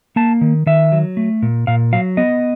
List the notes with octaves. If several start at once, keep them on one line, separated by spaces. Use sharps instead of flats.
A#3 A5
D#3
D#3 E5
F#3
A3
A#2
A#2 F5
F#3 F5
B3 D#5